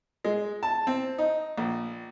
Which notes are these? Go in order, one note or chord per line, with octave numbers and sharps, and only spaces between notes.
G#3
A5
C4
D#4
A#1